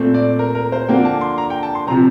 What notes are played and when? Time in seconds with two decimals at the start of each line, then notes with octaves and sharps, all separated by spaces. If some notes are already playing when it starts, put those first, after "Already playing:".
Already playing: A#2 A3 C4
0.14 D5
0.39 A#4
0.55 A#4
0.72 C5
0.88 D3 F3 A#3 D4 G5
1.05 A5
1.21 C6
1.38 A#5
1.50 G5
1.63 A5
1.75 C6
1.87 C3 F3 C4 A#5